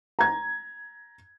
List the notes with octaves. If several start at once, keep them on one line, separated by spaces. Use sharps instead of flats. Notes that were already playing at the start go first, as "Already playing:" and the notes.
A#5 G#6